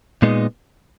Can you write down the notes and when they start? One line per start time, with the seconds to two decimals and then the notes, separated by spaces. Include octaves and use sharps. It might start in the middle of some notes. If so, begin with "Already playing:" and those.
0.22 A#2 G#3 B3 D#4